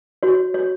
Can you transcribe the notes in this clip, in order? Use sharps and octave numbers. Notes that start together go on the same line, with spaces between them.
F#4 C#5
C#5